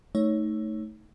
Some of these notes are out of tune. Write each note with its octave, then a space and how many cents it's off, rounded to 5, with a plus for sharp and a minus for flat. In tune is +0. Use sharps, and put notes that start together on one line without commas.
A3 +0 D#4 +15 C#5 +0